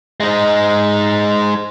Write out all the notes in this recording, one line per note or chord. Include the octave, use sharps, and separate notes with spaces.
G#3 D#4